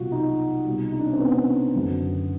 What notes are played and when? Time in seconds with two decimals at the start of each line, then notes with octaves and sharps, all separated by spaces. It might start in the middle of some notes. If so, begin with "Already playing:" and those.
Already playing: C2 B2 F#3 F4 F#4
0.12 D#4
0.65 C2 B2 G3
0.92 D#4
0.99 D4
1.07 C#4
1.13 C4
1.20 B3
1.75 F#1 F#2 D3